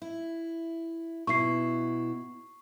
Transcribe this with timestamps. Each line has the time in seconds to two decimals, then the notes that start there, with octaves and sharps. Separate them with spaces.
0.02 E4
1.27 B2 E4 C#6 C7